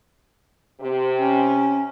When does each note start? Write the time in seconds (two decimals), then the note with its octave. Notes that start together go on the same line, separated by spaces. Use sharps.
0.81 C3
1.17 C#4